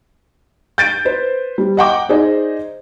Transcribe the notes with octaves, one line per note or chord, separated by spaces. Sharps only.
G6 A6 D7
B4 C5
G3
D#5 F#5 G5 D6
D#4 G#4 C5 D5 D#5